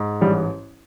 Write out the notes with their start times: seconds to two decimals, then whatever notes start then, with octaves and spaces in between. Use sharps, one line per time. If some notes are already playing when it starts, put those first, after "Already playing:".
Already playing: G#2
0.21 A1 G3